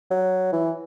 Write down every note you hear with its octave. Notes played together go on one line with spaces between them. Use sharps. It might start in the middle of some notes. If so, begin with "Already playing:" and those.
F#3
E3